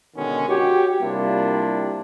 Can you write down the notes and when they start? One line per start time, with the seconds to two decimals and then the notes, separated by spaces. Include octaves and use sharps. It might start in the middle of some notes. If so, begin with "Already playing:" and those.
0.16 B2 D3 D#3 G#3 B3 C#4
0.49 F#4 G4 C#5
1.02 C3 G3 A#3 D4 E4 F4